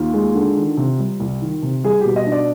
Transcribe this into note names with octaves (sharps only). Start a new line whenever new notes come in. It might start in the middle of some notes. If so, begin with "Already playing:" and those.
Already playing: D#2 F4
G#3
D3
D#3
C3
G3
C2
D#3
C3
G3 G#4
B2 G4
D#5
D4
D5